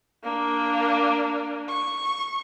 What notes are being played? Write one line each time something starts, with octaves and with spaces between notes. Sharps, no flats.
A#3 D4
C#6